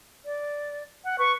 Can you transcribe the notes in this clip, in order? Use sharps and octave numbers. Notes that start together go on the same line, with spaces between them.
D5
F#5
B4 C#6